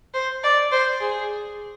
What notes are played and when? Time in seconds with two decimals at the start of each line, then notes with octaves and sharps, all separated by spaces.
0.14 C5
0.44 D5
0.72 C5
1.01 G#4